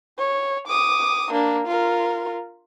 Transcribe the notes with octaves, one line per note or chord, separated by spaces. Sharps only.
C#5
D6 D#6
A#3 D4
F4 A#4